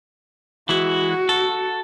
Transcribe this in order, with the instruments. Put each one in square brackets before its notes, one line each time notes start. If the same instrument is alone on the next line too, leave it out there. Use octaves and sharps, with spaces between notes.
[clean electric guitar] E3 G#3 E4 [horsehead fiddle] F#4
[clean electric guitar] A4